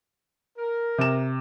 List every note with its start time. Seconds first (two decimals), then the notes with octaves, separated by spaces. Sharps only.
0.58 A#4
0.98 C3 E7